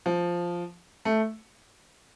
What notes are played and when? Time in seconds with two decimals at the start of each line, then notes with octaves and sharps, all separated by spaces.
0.06 F3
1.05 A3